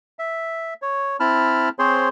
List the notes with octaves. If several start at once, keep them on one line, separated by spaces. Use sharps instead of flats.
E5
C#5
C4 E4 A5 B5 F6
C4 G#4 C5 C#5 C6